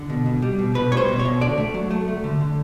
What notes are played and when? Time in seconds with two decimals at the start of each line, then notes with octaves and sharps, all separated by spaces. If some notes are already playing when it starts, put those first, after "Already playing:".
Already playing: D3
0.10 B2
0.26 B2
0.42 G3
0.59 B2
0.74 B2 B4
0.91 G3 C#5
0.97 C5
1.08 B2
1.19 C#5
1.25 B2
1.41 D3 D5
1.58 A3
1.74 F#3
1.91 A3
2.08 A3
2.24 D3
2.41 D3